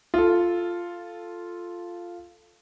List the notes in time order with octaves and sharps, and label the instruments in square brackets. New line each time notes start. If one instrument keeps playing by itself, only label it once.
[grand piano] F4 A4